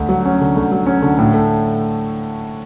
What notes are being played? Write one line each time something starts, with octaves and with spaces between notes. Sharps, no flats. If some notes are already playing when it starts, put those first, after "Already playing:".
Already playing: D2
F#3
C#4
D3
D2
F#3
C#4
D3
A2
A3